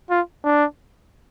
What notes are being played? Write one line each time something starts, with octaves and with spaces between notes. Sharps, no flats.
F4
D4